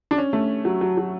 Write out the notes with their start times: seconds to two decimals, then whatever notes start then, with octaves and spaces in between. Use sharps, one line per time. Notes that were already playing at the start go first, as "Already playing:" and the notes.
0.11 D4
0.18 C#4
0.33 A3
0.65 F#3
0.81 F#3
0.98 F#3